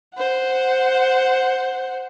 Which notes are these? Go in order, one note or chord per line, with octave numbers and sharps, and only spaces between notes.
C5 F#5